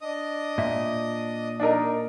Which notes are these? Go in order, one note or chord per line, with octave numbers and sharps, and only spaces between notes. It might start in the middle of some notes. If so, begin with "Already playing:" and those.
D4 D#5 D#6
A#2 E5
D4 D#4 A#4